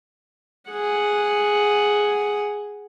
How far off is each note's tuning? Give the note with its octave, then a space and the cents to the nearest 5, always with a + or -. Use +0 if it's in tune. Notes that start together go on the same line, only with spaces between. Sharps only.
G#4 +0 F#5 +0